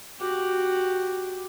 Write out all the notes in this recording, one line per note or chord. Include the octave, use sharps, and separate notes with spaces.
F#4 G4